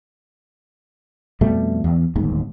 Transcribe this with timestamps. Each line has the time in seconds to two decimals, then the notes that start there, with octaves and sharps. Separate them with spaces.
1.41 F2 B2 G3 A3
1.84 E2
2.16 D1 G1 D#2 G#2